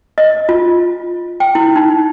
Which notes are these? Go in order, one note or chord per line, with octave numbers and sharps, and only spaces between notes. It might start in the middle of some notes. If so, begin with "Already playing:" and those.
D#5
F4
G5
E4
D#4